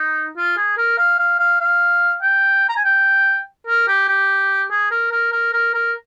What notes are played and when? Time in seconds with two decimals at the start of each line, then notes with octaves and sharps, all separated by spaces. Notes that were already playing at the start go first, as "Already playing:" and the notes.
Already playing: D#4
0.37 F4
0.57 G#4
0.77 A#4
0.98 F5
1.18 F5
1.39 F5
1.61 F5
2.22 G5
2.69 A#5
2.76 G#5
2.85 G5
3.67 A#4
3.87 G4
4.08 G4
4.71 G#4
4.91 A#4
5.11 A#4
5.32 A#4
5.53 A#4
5.74 A#4